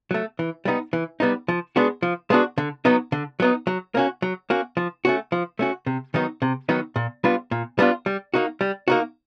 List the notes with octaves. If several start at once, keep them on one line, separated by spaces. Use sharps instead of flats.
F#3 A3
E3
G3 B3 D#4
E3
G3 B3 D#4
F3
G#3 B3 D4 F#4
F3
G#3 B3 D4 F#4
D3
F#3 B3 D#4
D3
F#3 B3 D#4
F#3
A#3 C#4 F#4
F#3
A#3 C#4 F#4
F3
A3 C#4 F#4
F3
A3 C#4 F#4
C3
D#3 F#3 B3 D#4
C3
D#3 F#3 B3 D#4
A#2
G3 B3 D4 F4
A#2
G3 B3 D4 F4
G3
A#3 D#4 F#4
G3
A#3 D#4 F#4